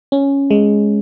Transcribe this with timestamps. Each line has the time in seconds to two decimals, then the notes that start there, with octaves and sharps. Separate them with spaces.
0.12 C#4
0.51 G#3